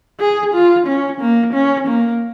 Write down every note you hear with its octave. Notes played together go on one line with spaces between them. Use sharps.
G#4
F4
C#4
A#3
C#4
A#3